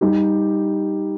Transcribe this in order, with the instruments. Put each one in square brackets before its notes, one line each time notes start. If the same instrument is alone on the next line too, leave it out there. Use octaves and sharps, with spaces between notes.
[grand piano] G3 D#4 G4